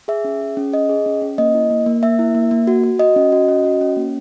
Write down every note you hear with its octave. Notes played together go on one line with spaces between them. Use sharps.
G#4 E5
C#4
G#4
C#4
G#4 D#5
G#4
C#4
C#4
A#3 D#5
E4
A#3
A#3
A#3 E5
E4
A#3
A#3
F#4
F#4
F#4 D#5
C#4
F#4
C#4
F#4
C#4
A#3